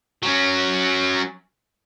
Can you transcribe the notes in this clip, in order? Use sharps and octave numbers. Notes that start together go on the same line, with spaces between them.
F#3 C#4